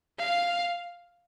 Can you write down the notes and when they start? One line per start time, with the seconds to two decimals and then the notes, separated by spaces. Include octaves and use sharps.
0.19 F5